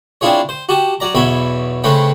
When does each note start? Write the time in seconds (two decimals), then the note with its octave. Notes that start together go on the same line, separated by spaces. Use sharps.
0.21 C4 D4 E4 F4 G#4 C#5
0.49 C5
0.69 F#4 G4 A5
1.00 F#3 D5 A#5
1.15 B1 E2 B2 C#5 E5 B5
1.84 C#3 A3 C4 C#4 B4 G5